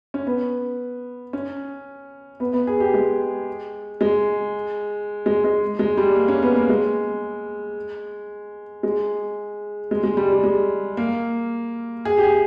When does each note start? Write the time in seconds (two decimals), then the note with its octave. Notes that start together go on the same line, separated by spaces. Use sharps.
0.14 C#4
0.27 B3
1.33 C#4
2.40 B3
2.53 B3
2.67 G#4
2.80 G4
2.94 G#3
4.01 G#3
5.26 G#3
5.44 G#3
5.79 G#3
5.97 G3
6.16 A#3
6.28 C#4
6.43 B3
6.56 A#3
6.69 G#3
8.83 G#3
9.91 G#3
10.03 G#3
10.17 G3
10.31 G3
10.44 G#3
10.97 A#3
12.05 G#4
12.17 G4
12.23 G#4